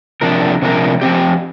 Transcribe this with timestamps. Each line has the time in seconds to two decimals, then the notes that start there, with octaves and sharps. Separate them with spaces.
0.21 C3 F3 D4 A#4
0.62 C3 F3 D4 A#4
1.01 F3 C4 G4